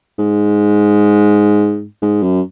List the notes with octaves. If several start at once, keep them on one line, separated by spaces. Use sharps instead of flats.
G#2
G#2
F#2